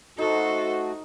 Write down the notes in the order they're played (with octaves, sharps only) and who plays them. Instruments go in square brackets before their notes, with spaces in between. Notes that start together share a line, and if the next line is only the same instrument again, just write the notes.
[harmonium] A3 F#4 [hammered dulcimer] D#4 [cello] A4 C5